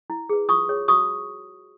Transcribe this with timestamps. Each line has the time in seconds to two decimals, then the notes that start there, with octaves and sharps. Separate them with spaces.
0.10 E4
0.29 G#4 B4
0.49 F4 C#6 D#6
0.68 G#4 C#5
0.88 F#4 C#6 D#6